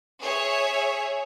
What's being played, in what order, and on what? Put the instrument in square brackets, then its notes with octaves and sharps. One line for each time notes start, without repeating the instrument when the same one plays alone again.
[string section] G#4 C#5 E5